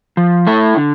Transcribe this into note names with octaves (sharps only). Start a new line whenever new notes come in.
F3
A3 E4 A4
D3